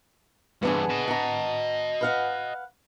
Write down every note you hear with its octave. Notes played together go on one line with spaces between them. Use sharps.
G2 E3 B3 D4 G#4
D#5 A5
F#5 A#5
B4 F5 F#5